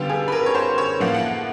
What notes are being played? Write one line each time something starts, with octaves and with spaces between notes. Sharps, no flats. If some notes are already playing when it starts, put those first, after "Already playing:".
Already playing: D3 G3 B3 F4 G4
G#4
B4
A#4
C#5
C5
C#5
A2 F3 A#3 F#5
F5
F#5